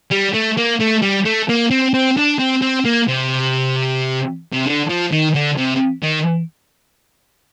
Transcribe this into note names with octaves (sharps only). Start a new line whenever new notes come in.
G3
A3
A#3
A3
G3
A3
A#3
C4
C4
D4
C4
C4
A#3
C3
C3
D3
F3
D#3
D3
C3
D#3